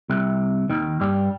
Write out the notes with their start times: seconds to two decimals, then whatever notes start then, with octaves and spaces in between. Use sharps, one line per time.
0.10 C2 C3
0.70 D#2 D#3
1.00 G2 G3